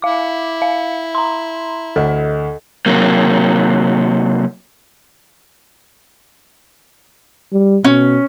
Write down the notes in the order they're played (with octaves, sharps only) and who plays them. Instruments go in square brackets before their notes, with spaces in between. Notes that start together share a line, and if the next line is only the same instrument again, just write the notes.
[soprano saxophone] E4 [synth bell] F5 D6
[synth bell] F5
A#5 C6
[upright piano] D2 [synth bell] A4 D#5
[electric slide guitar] C3 F#3 A#3
[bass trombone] G3
[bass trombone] B2 [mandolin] C#4